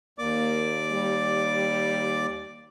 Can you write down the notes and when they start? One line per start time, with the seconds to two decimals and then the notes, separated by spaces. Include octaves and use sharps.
0.19 D#2 A#3 D5 D6
0.91 G3